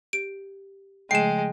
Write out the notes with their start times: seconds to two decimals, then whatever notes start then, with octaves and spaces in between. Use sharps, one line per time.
0.13 G4 D7
1.11 C#3 F3 G#3 A3 G5 C7 E7